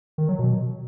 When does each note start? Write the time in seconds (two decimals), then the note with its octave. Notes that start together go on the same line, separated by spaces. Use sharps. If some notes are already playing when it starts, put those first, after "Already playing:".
0.18 D#3
0.28 F#3
0.39 B2